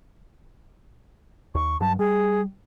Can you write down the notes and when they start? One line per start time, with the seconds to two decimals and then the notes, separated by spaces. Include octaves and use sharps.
1.55 D#2 C#6
1.81 G2 F#3 A5
1.99 G3 G#4